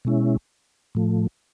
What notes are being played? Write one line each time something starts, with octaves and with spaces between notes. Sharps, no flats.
B2 G#3 C#4 E4
A2 F3 A3